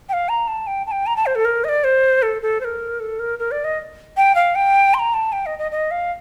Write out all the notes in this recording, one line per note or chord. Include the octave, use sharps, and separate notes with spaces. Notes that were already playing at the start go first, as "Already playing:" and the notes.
G5
F5
A#5
A5
G5
A5
G5
A#5
A5
C5
A4
A#4
D#5
D5
C5
A4
A4
C5
A#4
A4
A#4
A#4
D5
D#5
G5
F5
G5
C6
A#5
A5
G5
D#5
D#5
D#5
F5